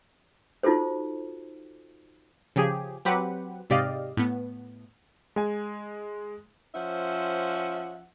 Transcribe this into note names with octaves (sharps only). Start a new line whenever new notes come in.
D#4 F4 F#4 A4 C5
C#3 F3 G4 G#4
F#3 C4 G4 B4 F#5
G#2 C3 G4 D5 D#5 F5
A2 B3
G#3 G#5
F3 C#4 C5 E5 F#5